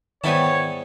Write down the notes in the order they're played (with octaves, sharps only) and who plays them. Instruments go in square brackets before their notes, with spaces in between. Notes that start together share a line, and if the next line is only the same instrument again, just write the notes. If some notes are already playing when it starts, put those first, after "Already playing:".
[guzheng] G#2 G3 G#5 [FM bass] D#3 [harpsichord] B3 E4 A5 [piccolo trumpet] C#5